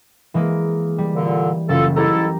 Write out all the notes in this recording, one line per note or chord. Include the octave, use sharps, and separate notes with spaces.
E3 G#3 A#3
G3
A#2 D3
F#1 F4 A4
G#2 E4 G4 A4 A#5